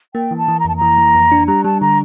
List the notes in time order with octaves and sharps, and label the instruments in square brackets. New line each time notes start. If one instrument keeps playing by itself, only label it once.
[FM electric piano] A#3 [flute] G5
[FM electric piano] E3
[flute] A5
[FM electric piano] E3
[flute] A#5
[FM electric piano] F2 [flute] A5
[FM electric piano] E3 [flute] A#5
[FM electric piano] E3
F2
D4
[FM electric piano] G3 [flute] A#5
[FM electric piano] G3 [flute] A5
[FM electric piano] D3 [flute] A#5